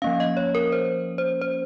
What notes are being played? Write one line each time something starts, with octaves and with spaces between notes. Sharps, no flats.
F3 A#3 C#4 F5
D#5
C#5
A#4
C5
C5
C5